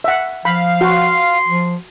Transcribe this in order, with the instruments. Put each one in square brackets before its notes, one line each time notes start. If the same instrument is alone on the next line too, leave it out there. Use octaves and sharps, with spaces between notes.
[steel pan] E5 F#5
[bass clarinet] F3 [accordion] F5 [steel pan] B5
[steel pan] F#4 [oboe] C6
[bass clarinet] F3